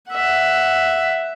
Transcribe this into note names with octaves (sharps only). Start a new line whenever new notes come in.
E5 F#5